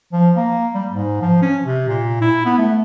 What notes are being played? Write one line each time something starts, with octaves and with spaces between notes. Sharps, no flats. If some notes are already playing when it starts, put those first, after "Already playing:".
F3
A#3
G3
G#2
F3
C#4
C3
A#2
E4
B3
A3